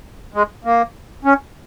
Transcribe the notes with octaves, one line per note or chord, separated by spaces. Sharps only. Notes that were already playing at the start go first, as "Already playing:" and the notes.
G#3
A#3
C#4